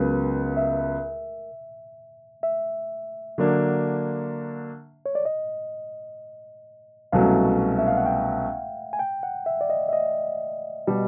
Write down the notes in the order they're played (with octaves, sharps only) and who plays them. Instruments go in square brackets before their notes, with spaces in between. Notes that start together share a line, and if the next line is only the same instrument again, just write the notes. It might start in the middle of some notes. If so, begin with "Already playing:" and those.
Already playing: [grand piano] C#2 C#3 F#3 B3 [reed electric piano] A#4
[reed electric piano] E5
E5
[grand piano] D3 F#3 A#3 D4
[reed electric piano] C#5
D5
D#5
[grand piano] C2 B2 F#3 A3 C#4 [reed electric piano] F5
[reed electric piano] E5
F5
F#5
G5
G#5
G5
F#5
E5
D5
D#5
E5
D#5
[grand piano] B2 G3